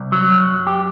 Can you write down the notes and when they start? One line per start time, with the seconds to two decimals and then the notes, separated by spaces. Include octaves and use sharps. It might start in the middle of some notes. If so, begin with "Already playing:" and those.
Already playing: C2
0.12 F#3
0.30 F#2
0.49 F#2
0.67 G4